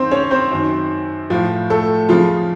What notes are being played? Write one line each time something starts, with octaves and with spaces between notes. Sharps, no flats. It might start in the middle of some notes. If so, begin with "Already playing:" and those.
Already playing: F2 D#3 C4 C5
C#4 C#5
C4 C5
F#2 D#3
A2 F3 F4
A3 A4
F2 C#3 F3 F4